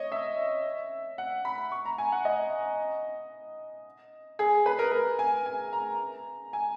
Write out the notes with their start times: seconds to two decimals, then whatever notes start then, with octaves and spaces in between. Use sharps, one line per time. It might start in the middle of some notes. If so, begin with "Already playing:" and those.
Already playing: C#5 D#5
0.12 E5
1.18 F#5
1.45 B5
1.72 C#6
1.85 A#5
1.98 G#5
2.12 F#5
2.25 D#5
4.39 G#4
4.66 B4
4.79 A#4
4.92 A#4
5.19 G#5
5.46 G#5
5.73 A#5
6.53 G#5